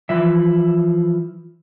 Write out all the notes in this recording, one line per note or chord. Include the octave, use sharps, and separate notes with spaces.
E3 F3 E4 E5